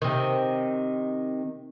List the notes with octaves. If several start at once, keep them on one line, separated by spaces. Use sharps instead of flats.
C3 D#3